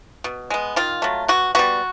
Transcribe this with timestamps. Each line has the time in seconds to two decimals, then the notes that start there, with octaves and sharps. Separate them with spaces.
0.24 B2
0.50 G#3 B3
0.76 D#3 F4
1.02 F#3 A3
1.28 B2 F#4
1.55 G3 B3 F#4